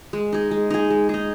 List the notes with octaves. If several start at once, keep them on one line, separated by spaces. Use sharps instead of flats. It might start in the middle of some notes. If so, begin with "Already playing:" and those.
G#3
D#4 G#4
G#3
D#4 G#4
G#3
D#4 G#4